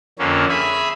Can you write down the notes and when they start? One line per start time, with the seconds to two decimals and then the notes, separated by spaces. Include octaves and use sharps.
0.19 F2 D3 A#3 C#4
0.49 G#4 E5 B5